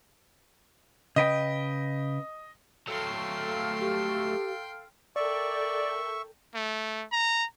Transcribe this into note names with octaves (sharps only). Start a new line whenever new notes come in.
C#3 B4 D#5 G5
F#3 A3 A4 F5 G5 C6 F6
G4
A4 A#4 D5 E5 G5 C#6
A3
A#5